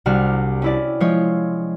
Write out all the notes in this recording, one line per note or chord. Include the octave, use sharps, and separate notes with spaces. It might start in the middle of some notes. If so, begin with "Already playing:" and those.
C2 C3 D4 F#4 F6
C#4 E4 D5
F3 G#3 F4 C#5